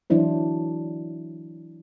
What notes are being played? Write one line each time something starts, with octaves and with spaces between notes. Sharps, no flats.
E3 F#3 D4 E4 C5